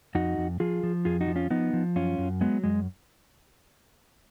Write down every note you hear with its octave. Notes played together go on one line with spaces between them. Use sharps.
F2 D#4 F#4
F2
F3 F4 G#4
F3
F2 F4 G#4
D#4 F#4
F3
C#4 F4
F3 B3 D#4
F3
F#2 C#4 F4
F#2
F#3 G#3 B3
F#2 G#3